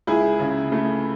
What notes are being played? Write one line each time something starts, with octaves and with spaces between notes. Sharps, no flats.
C#2 E4 G#4
C#3
A3